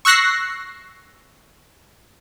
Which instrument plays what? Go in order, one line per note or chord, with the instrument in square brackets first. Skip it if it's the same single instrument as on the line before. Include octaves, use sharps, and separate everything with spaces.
[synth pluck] C#6 E6 F#6 A#6 C7